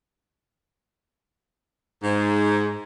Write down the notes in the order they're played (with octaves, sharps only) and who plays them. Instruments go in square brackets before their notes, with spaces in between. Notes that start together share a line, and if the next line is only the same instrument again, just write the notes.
[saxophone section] G#2